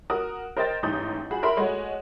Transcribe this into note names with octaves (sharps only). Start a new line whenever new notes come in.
F#4 A#4 D#6
A#4 C5 D#5 G5 A6
A1 G#2 G4 D#6 G6
F#4 G#4 B5
A#4 E5 B5 C6
G#3 A3 F#4 C#5